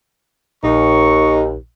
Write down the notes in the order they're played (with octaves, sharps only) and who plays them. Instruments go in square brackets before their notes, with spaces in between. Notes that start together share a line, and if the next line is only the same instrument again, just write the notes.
[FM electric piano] A#1 [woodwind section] D#2 [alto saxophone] D#4 [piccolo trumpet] C#6